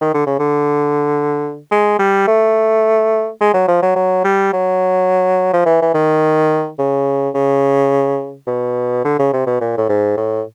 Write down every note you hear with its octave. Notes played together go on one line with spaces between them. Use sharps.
D#3
D3
C#3
D3
G#3
G3
A3
G#3
F#3
F3
F#3
F#3
G3
F#3
F3
E3
E3
D#3
C#3
C#3
B2
D3
C#3
C3
B2
A#2
A2
G#2
A2